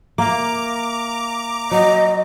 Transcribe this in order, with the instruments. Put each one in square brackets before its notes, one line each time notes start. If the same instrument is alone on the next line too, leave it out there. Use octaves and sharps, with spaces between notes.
[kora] A#3 [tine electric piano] E5 F5 [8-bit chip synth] A#5 D6
[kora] F#3 [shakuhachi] D#5